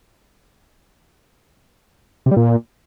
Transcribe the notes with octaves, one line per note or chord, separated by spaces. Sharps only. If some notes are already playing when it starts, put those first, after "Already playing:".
C3
G3
A#2